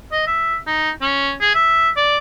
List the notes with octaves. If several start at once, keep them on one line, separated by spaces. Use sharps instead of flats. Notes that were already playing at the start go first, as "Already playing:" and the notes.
D#5
E5
D#4
C#4
G#4
E5
D5